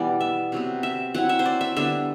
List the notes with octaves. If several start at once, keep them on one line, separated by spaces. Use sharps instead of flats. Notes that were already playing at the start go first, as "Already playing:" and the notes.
Already playing: B2 E3 G3 B3 D5
E5
C3 F#3 B3
E5
F#3 C4 E4 F#5
E5
C5
D5
E5
D3 G3 B3 D4 E5